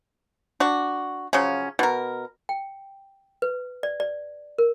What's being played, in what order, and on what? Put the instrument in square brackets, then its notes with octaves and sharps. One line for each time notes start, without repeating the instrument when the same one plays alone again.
[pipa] D4 F#4
C#3 F3 F#3 C#4
B2 A#4
[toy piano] G5
B4
D5
D5
A#4